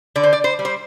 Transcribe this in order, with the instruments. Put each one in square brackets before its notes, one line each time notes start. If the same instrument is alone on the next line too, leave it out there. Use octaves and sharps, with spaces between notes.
[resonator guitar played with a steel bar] D3 D5
C5
D5
C5
G3
C5